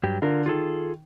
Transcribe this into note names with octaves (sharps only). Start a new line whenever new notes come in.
G2 F#3 G4
D3 F4 A#4
D#3 F4 G#4 A4